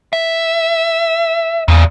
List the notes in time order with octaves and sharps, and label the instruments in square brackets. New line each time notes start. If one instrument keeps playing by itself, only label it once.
[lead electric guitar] E5
[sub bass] E2 [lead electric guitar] A#2 C#3